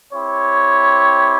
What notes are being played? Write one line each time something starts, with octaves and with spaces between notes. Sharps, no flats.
C4 E4 G4 C#5